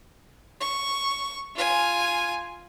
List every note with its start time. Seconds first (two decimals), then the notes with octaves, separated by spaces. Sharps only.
0.61 C#6
1.56 F4 G#5